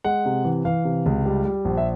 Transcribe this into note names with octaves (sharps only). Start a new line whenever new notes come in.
G#3 F#5
C3
E3
E3 F5
C3
C#2
G3
G3
A#1
E5